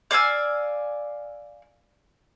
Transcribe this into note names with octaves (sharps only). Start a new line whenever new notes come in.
D5 F5 G#5 E6